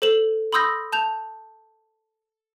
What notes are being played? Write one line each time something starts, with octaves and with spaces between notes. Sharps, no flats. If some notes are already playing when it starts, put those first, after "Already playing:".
A4 C5 E7 F#7
B5 C6 D#6 E6 G6 A#6
A5 G6 F7